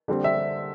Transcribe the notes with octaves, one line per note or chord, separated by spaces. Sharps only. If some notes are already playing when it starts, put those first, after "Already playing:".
D3 G3 C4
E5